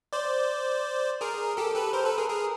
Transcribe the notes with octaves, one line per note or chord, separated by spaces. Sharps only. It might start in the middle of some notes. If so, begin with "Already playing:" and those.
C5 D5
G#4 A#4
G4 A4
A4 B4
A#4 C5
A4 B4
G#4 A#4
G#4 A#4